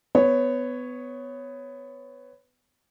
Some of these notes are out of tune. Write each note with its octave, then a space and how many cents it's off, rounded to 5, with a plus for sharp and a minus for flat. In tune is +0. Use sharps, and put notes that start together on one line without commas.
B3 +20 C#5 +0